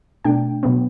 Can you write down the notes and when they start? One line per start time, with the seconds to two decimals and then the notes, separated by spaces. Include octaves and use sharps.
0.24 B2 A3 D4 G5
0.63 B2 F#3 B3